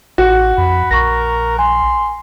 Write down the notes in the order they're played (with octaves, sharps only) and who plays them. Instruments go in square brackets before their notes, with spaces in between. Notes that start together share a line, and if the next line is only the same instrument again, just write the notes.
[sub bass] A1 [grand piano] F#4
[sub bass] F2 [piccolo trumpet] B5
[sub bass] A#1 [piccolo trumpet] A#4 [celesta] C#6 A#6
[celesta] G#5 [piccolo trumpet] C6